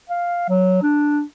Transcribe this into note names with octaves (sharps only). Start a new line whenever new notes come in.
F5
F#3
D4